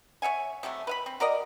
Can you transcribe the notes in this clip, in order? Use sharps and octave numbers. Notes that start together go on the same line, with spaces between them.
C#5 E5 F#5 G#5
C3 F#3 G3 A3
B4 F5 B5
C4
F#4 A#4 D5 D#5